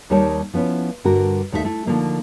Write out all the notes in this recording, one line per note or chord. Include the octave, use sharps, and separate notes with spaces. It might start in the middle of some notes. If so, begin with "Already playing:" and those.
D#2 G3 D#4 A#4 C#5 A5
F3 B3 C#4 E4
G2 D3 F#4 A#4
D#2 A3 D#4 E4 E5
A3 E4
D3 F3 A3 A#3 D#4